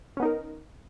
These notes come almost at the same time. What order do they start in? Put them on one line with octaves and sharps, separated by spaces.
C#4 B3 D#4 A#4